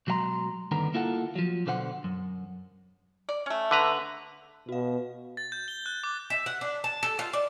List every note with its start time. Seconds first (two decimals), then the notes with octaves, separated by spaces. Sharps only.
0.07 B2 F#3 G#3 F5 A#5 C6
0.71 D2 G2 D3 D#3 B3 A#5
0.94 A#3 E4 F4 A4 F#5
1.36 F3 F#3
1.66 B1 B2 D3 C5 F5 F#5
2.04 F#2
3.29 D5
3.46 A3 C#4
3.71 D3 B4 A#5
4.69 B2 F#4 F5
5.37 A6
5.52 G6
5.68 G7
5.86 F#6
6.04 D6
6.30 E5
6.46 F#5
6.61 D4
6.84 A5
7.03 A4
7.19 F4
7.33 D5